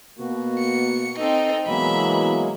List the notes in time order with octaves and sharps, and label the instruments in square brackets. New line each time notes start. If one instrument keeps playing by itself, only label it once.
[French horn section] B2 A#3 [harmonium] F#4
[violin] C#7
[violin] C4 D#4 [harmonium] A4
[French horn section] B2 E3 [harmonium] F#3 G#3 A#3 [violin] E5 B5